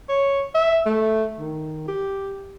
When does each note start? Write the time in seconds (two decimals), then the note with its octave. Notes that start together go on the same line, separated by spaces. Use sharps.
0.09 C#5
0.55 E5
0.86 A3
1.39 D#3
1.88 G4